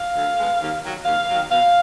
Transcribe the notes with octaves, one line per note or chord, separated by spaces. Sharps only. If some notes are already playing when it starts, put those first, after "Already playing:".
Already playing: F5
D2
D3 G#3 B3
D#2
D#3 F#3
D#2 F5
D#3 F#3
B2 F5